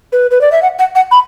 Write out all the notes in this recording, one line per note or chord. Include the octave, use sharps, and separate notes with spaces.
B4
B4
D5
E5
F#5
F#5
F#5
B5